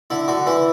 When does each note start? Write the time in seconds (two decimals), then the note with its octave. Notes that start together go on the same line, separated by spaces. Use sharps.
0.10 D3 E4
0.28 D3 F#4
0.46 E3 E4